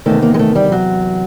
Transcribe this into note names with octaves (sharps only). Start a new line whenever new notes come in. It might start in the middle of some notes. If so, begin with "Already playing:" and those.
E2 C3 D#3 A3
A#3
G#3
A3
G3
F#3